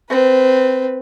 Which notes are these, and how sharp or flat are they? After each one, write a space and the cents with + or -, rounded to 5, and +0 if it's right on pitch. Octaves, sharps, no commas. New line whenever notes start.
C4 -15 B4 +0